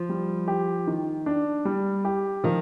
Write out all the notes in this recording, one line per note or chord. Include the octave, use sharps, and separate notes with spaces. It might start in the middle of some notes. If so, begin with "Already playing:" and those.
Already playing: F3
G3
G4
D#3
D4
G3
G4
D#3 F3